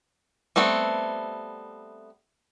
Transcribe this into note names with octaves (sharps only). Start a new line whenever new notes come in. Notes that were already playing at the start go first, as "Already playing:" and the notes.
G3 A3 B3 C4